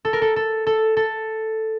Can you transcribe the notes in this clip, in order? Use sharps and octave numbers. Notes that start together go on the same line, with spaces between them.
A4
A#4
A4
A4
A4
A4